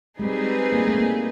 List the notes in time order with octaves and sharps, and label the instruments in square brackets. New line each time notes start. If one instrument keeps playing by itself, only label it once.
[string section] G3 C4 D#4 G#4 B4 [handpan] G#3
[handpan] A#3
A3
A#3